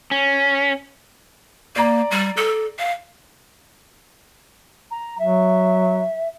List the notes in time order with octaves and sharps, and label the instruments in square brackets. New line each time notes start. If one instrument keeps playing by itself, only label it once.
[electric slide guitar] C#4
[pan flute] A#3 [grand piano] D5 A#5
[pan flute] G3
A4
F5
[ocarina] A#5
[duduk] F#3 [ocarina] E5